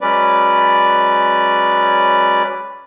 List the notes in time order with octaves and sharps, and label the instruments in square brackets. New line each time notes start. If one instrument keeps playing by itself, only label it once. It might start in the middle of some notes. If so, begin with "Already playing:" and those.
[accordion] F#3 G#3 C#4 B4 D5